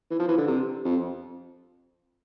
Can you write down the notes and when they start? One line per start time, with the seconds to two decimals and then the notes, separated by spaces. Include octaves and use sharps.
0.11 E3
0.19 F3
0.28 E3
0.38 D3
0.48 C3
0.85 F2